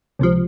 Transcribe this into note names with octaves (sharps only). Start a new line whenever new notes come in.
C#2 C3 F3